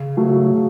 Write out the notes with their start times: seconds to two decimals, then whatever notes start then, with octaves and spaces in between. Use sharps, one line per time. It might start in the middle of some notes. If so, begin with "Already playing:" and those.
Already playing: C#3
0.17 F#3 A3
0.53 C#3